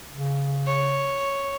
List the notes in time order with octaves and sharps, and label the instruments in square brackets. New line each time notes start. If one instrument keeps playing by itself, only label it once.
[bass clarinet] C#3
[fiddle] C#5